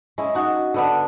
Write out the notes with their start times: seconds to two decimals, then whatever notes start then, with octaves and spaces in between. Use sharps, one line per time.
0.18 G#3 C#4 E4
0.35 D#4 F#4
0.74 D3 B3 D4